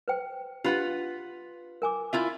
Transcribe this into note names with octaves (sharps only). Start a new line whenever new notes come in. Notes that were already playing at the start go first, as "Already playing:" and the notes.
B4 C5 G5
D4 F4 G4 B4 F#5 B5
A#4 G#5 D6
E4 F4 E5